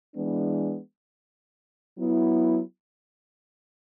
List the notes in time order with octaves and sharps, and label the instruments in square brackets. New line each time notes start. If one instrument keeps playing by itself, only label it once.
[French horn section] E3 G#3 B3 D4
F#3 B3 E4